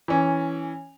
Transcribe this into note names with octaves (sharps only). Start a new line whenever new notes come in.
E3 C#4